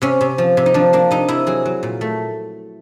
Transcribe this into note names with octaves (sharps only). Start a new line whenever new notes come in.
C3 C#4
C3
F3
C3
D#4
F3 D4
A#3 D4
C3 D#4
C3 E4
F#3 G#4
F#3
A#2
A3